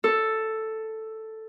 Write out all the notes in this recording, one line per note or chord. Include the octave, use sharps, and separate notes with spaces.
A4